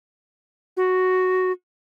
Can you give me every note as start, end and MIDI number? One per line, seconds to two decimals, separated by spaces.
0.77 1.52 66